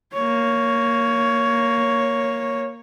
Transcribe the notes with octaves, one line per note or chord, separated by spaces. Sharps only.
A#3 C#5